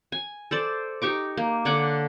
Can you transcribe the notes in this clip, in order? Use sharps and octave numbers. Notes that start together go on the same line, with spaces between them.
G#5
A4 C5 D5
D#4 G4 C#6 D6
A#3
D3 C#5 F#5 D6